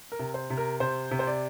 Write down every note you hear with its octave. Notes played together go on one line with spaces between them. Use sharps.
A#4
C3
C5
C3
A#4
C3 C5
C3
C5
D5